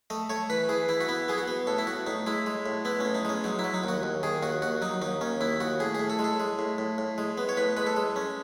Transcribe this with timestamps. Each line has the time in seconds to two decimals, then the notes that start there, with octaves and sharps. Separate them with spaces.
0.10 A3 D#5
0.30 A3 C#5
0.50 E3 B4
0.69 E3 G#4
0.89 E3 E4
1.01 F#4
1.09 B3 E4
1.28 B3 G#4
1.38 F#4
1.48 B3
1.67 A2 A4
1.78 E4
1.87 A2 F#4
2.07 A2 D#4
2.27 G#3 E4
2.46 G#3
2.66 A2
2.85 B3 E4
3.00 A2 C#4
3.15 D#4
3.25 G#3 C#4
3.44 F#3 D#4
3.59 E4
3.64 F#3
3.74 D#4
3.84 D#2 F#4
4.03 D#2
4.23 D#3 G#4
4.43 D#2 F#4
4.62 D#2 F#4
4.82 F#3 D#4
5.02 D#2 D#4
5.21 D#2 C#4
5.41 D#2 E4
5.60 D#2 F#4
5.80 A2 G#4
5.95 A2 G#4
6.10 A4
6.19 G#3
6.24 A4
6.40 G#3
6.59 A2
6.78 A2
6.98 A2
7.18 G#3
7.38 B3
7.49 C#5
7.57 A2 B4
7.77 G#3 B4
7.87 A4
7.96 G#3
8.16 C#4